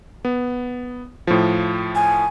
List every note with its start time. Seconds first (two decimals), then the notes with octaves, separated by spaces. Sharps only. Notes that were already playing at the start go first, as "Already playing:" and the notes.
0.25 B3
1.27 A2 F3
1.95 G#5